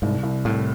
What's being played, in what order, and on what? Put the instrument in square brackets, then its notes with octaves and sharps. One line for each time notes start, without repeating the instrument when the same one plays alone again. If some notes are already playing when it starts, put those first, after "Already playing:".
[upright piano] C2 [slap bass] G#2
[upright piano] C2
[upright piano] C2 [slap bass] A2